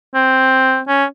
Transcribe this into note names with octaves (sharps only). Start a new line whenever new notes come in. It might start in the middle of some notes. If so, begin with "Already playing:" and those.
C4
C#4